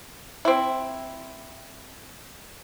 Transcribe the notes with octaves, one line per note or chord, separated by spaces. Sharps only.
C4 E4